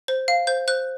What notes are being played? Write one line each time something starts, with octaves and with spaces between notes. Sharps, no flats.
C5
F5
C5 G6
C5 F#6